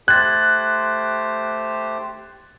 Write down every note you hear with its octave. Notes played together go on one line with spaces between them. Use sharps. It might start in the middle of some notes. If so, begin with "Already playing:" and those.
A3 G4 C5 F#6 G#6 A6